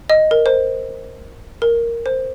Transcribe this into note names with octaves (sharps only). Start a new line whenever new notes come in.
D#5
A#4
C5
A#4
C5